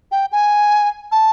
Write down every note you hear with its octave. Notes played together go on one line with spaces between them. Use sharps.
G5
G#5
A5